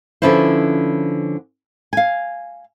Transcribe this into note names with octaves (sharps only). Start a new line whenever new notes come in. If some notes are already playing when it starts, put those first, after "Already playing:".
D3 F3 C#4 E4 B4 C5
F5 G#5